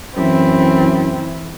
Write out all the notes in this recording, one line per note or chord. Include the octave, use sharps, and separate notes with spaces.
F#2 E3 C4 E4